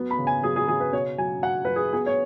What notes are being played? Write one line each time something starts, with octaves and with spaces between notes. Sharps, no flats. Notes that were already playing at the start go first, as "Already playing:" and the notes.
Already playing: F#3 B3
B5
C#3
G#5
F#3 G#4
G#4
C#3 G#4
B4
B2 C#5
F#3 G#5
F#3 F#5
F#3 B4
G#4
B3 G#4
C#5